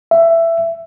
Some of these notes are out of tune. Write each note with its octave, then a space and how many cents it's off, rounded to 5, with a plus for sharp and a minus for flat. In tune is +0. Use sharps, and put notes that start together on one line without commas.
E5 +15